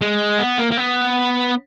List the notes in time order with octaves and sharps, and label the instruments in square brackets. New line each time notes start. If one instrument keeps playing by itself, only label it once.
[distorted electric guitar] G#3
B3
A#3
A#3
B3